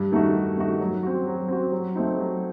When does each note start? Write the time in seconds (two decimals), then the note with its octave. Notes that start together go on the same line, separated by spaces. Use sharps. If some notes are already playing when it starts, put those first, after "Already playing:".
Already playing: G2
0.12 D#3 A3 D#4 F#4
0.34 G2
0.57 D#3 A3 D#4 F#4
0.80 F#3
1.03 C4 F#4
1.27 F#3
1.48 C4 F#4
1.72 F#3
1.95 A3 C4 D#4
2.18 F#3